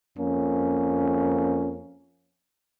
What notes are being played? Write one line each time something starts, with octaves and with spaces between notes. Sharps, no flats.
F2 A#3 C#4